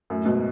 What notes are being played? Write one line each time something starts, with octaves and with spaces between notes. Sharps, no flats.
F#2 A2
G#2 B2